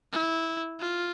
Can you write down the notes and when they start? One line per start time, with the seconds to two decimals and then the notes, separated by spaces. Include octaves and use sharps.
0.12 E4
0.80 F4